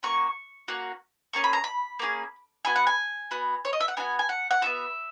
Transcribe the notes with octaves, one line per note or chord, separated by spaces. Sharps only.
A#3 C#4 F#4 C#6
A#3 C#4 F#4
A#3 C#4 G#4 C#6
B5
A#5
B5
A#3 C#4 G#4
B3 F#4 G#5
F#5
G#5
B3 F#4
C#5
D#5
E5
F#5
B3 D#4 F#4 G#5
G#5
F#5
F#5
B3 D#4 F#4 E5